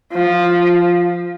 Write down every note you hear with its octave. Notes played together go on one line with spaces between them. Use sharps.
F3